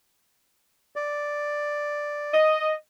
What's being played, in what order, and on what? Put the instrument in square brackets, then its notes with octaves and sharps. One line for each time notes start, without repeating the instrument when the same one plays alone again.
[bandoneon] D5
[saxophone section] D#5